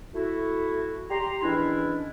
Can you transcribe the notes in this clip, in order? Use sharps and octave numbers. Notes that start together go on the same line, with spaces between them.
A3 E4 F#4
G4 A#5 C6
E2 D#3 E3 C#4 D4 E4